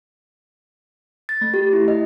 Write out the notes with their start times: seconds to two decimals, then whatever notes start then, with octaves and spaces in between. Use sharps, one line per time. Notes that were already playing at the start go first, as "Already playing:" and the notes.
1.29 A6
1.41 A3
1.54 G4
1.73 E4
1.88 D#5